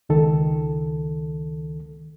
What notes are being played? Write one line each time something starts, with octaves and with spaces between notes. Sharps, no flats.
C#2 D#3 A4